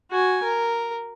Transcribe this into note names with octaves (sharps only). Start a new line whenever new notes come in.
F#4 G#5
A#4